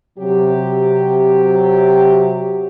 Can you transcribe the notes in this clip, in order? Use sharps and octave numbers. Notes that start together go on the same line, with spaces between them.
C3 F#3 G4